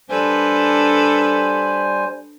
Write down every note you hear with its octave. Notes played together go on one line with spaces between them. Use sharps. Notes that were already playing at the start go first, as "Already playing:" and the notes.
G3 D4 A4 B4 C5 G#5